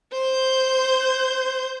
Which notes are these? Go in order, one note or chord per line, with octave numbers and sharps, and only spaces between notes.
C5 G6